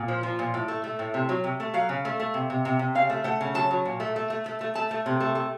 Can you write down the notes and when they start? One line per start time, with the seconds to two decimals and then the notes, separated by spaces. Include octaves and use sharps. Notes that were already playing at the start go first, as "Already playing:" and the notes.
Already playing: A#2
0.08 F3
0.23 F3
0.39 A#2
0.54 A2
0.68 A3
0.84 A3
0.99 A2
1.14 C3
1.29 F#3
1.44 C3
1.60 A3
1.74 F#3 F5
1.89 C#3
2.05 A3
2.20 A3
2.34 C3
2.50 C3
2.65 C3
2.79 C3
2.95 C#3 F5
3.10 A3
3.24 A3 F#5
3.41 C#3
3.54 F#3 A5
3.71 F#3
3.85 A#2
4.00 A3
4.16 A3
4.30 A3
4.46 A3
4.61 A3
4.75 A3 A5
4.91 A3
5.06 C3
5.20 A3
5.35 A3